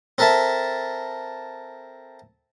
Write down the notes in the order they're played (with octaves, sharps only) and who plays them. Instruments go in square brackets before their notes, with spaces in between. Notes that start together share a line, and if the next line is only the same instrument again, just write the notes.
[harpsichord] C4 A4 A#4 E5 A5